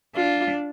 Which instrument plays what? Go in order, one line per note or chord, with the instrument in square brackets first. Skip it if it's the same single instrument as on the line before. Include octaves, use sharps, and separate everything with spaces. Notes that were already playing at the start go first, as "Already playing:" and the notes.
[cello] D4 [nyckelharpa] F4